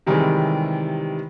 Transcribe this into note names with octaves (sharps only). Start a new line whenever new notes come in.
C3 D#3 E3 G3 G#3 C4